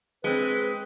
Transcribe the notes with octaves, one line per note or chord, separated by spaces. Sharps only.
G#3 C4 B4